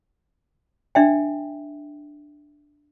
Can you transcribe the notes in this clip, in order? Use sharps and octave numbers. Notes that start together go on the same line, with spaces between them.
D4 E5 G5